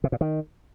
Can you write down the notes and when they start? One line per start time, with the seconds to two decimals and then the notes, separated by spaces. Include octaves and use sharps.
0.04 C3
0.12 A#2
0.21 D#3